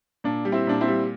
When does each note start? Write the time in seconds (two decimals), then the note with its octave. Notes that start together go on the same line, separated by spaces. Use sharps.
0.24 A#2 D4
0.45 G3
0.52 C4 E4
0.67 A#2 D4
0.81 C4 E4
0.88 G3